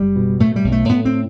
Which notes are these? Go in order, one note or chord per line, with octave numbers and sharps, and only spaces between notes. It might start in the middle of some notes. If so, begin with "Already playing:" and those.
Already playing: F#1 G3
B2
A2 A3
G3
B1
A3
A2 B3
C4